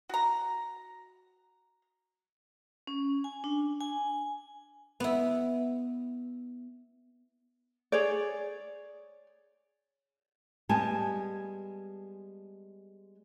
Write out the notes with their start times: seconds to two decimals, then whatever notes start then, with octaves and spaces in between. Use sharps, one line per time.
0.09 F#4 A#5
2.87 C#4
3.24 G#5
3.44 D4
3.81 G#5
5.00 B3 E4
7.92 G#4 C#5 D5
10.69 G3 G#3 B3 G#5 A5